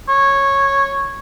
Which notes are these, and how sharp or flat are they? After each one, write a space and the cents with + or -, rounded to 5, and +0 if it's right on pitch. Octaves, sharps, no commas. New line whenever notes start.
C#5 -10